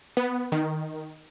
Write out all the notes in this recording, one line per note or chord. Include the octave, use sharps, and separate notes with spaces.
B3
D#3